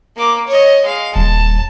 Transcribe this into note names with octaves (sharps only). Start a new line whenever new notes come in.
A#3 D6
C#5 D#5
G#3 F5
D#1 G3 A5